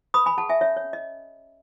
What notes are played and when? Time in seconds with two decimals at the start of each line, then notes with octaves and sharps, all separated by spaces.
0.14 B4 B5 D#6
0.26 G#5 B5
0.37 G#4 F#5 A5
0.49 E5 G#5
0.61 C#4 C#5 E5
0.77 C#5
0.85 C#4
0.93 D#5